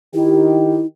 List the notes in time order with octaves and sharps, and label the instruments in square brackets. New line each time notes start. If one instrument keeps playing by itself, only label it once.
[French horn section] D#3 G4 [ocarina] E4